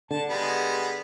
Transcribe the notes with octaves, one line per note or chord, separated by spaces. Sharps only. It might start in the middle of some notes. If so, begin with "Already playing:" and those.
D3 A5
G3 G#3 B3